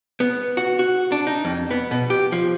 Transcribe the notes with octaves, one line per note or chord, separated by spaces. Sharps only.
B3
F#4
F#4
D4
D#4
F2
B3
B2
G4
F3